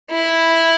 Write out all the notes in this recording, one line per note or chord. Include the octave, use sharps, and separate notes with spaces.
E4